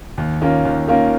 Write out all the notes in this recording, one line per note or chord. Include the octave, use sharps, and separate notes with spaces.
D#2
D#3 A#3 C#4 F4
D#2
D#3 A#3 C#4 F4